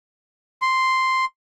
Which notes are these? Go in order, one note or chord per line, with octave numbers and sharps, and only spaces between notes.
C6